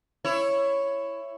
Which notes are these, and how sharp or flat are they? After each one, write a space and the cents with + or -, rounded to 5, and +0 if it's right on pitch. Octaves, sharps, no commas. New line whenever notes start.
E4 +15 C#5 +0